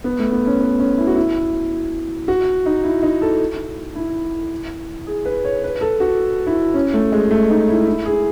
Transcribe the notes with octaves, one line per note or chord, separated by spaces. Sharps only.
B3
A3
B3
C#4
B3
C#4
E4
F#4
E4
F#4
D#4
E4
D#4
A4
E4
G#4
B4
C#5
B4
A4
F#4
E4
C#4
A3
G#3
A3
D#4
E4
E4
G#4